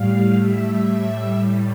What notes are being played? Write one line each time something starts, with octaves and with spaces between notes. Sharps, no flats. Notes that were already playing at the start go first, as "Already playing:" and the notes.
Already playing: A2 G3 F5
E5